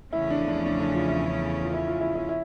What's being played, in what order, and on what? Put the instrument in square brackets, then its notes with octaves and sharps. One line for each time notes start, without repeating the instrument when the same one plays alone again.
[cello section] E2 C#3 F3 A3 C#4 [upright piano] E4
[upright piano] D4
D4
D4
D4
F4
E4
F4
E4
F4
E4
E4
E4